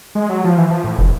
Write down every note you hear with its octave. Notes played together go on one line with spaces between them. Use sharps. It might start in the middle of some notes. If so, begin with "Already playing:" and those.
G#3
F#3
F3
E3
F3
A2
F1